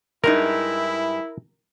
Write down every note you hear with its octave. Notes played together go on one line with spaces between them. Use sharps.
G2 G#3 D#4 E4 A#4